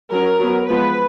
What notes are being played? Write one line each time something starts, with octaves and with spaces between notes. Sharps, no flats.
F#3 C#4 A#4
F#3 B3
F3 G#3 B3 B4